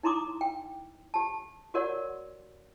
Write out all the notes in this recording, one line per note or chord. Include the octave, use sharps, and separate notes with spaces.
D#4 E4 A#5 C6 D6 D#6
G5
G4 A5
F#4 G4 A#4 C#5 D5 F#5